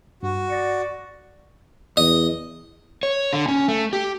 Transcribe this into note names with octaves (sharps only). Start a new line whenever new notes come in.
G2 F#4
D5 A#6 C#7
E2 D#5
C#5
D3
C#4
A3
G4